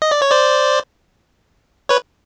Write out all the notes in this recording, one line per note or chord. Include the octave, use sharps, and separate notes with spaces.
D#5
D5
C#5
C5 D5
B4 C#5